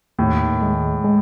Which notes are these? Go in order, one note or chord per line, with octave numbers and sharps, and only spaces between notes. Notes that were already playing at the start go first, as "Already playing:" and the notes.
D#2 A2
G#3
G#3